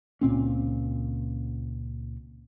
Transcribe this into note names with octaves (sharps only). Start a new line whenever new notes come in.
C#2 A#2 C4 C#4